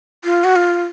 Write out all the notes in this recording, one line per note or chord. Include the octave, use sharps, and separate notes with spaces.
F4
F#4
F4